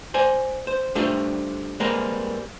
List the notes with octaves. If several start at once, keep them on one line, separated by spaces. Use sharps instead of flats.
C5 D5 G#5
C5
G3 A3 D4 F4 G4 C5
G3 G#3 A#3 C4 A#4 B4